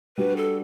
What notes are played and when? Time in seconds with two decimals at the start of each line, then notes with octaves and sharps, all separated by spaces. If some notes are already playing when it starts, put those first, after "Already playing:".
0.17 G3 D4 F#4 B4
0.37 A4